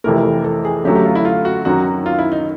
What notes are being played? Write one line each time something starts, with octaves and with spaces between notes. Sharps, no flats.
F2 C3 E3 A3 A#4
A4
G#4
F#2 D3 F#3 A3 G4
G4
F4
E4
F4
F#4
F#2 D#3 F#3 F#4
F4
E4
D#4